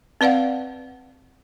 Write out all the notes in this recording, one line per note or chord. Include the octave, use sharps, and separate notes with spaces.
C4 B4 D5 F5 F#5